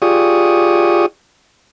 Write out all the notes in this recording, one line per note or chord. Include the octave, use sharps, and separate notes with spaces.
F4 G4 G#4 D5 C#6 D#6